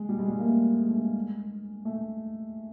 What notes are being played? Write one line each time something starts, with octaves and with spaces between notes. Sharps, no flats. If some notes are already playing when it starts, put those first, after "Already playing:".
Already playing: G#3
G3
G#3
G3
A#3
A3
G#3
A3
G#3
A3